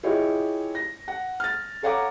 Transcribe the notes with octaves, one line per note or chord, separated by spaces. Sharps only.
E4 F4 G4 G#4 C#5 D#5
A#6
F#5
F6 A6
A4 C#5 F5 F#5 A#5 D6